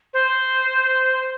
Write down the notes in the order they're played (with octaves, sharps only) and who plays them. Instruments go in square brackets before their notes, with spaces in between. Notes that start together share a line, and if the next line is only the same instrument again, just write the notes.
[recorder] C5